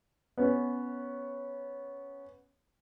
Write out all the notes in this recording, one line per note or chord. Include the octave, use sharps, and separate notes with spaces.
B3 C#4